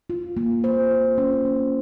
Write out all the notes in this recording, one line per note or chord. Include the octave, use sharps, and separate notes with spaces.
F4
A#3
C5
F4
C#4
A#3